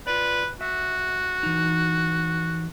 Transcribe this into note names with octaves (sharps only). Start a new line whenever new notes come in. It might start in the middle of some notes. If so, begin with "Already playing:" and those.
F4 B4 D5
F#4 E5
E3 D#4